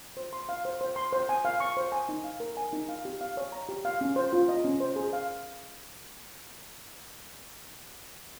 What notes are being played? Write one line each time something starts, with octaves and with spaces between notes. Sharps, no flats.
C5
C6
F5
C5
C5
C6
C5
G#5
F5
C#6
C5
G#5
D#4
F5
A#4
G#5
D#4
F5
G4
F5
C#5
A#5
G4
F5
C#4
C5
F4
D#5
C#4
C5
G#4
F5